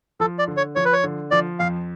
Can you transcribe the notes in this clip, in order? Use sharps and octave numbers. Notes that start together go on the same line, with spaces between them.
F3 A4
D5
D3
C#5
F3 C#5
B4
C#5
D3
F3 D5
F2 F5